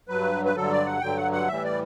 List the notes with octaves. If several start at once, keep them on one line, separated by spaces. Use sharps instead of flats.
G2 F#3 B4
B4
G2 D3 F#3 A4
D5
F#5
G2 D3 F#3 G5
F#5
F#5
A2 E3 G3 E5
D5